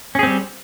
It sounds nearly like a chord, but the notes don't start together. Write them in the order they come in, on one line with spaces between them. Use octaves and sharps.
C#4 G#4 C4 G3